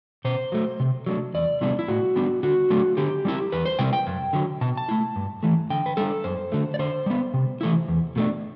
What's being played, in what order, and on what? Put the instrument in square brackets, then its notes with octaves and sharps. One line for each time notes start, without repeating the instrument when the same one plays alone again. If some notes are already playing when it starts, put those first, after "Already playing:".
[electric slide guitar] B2 C5
F#3 A3
C3
F#3 A3 D4
E2 D5
C3 G3 B3 D4 E4
E4
A2 F#4
G3 B3 D4
D3 F#4
F#3 A3 D4
D3 G4
G3 C4 E4
E2 B4
C5
C3 G3 C4 E4 G5
G5
F#2
D3 F#3
B2 A5
A5
A3 E4
G2
E3 A3
D3 G5
B4
G3 D4 A4
F#2 C5
D3 A3
D5
D3 C5
G3 B3
C3
E3 A3 E4
E2
B2 A3 D4